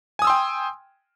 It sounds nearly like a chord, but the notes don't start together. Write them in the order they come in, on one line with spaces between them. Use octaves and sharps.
G#5 D#6 E6 C6 G5